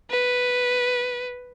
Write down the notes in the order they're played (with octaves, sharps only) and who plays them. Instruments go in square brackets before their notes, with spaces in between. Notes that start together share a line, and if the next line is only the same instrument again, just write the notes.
[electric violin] B4